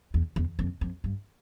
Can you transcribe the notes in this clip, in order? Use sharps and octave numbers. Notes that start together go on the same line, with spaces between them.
E2
E2
F2
F2
G2